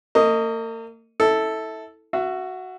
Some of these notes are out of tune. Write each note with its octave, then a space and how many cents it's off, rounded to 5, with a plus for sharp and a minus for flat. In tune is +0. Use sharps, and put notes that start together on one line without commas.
A#3 -40 D#5 +0
E4 -25 A4 +0
F#4 +0 E5 +30